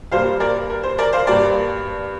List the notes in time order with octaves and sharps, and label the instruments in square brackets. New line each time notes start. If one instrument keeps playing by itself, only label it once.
[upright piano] G2 G3 A#3 C5 F5
A#4 D5
A#4
C5
A#4 D5
C5 F5
G2 G3 A#3 A#4 D5